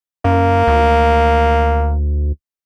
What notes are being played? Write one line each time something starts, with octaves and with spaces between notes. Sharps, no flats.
F#2 A#3
D2